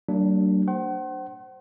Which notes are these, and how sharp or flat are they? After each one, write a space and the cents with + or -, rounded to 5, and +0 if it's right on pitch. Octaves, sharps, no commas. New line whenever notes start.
F#3 +45 A#3 -35 D4 +0
C5 +0 F#5 +40 C6 +35